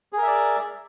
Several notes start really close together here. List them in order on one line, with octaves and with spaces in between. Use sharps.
G#4 A#4 E5 D5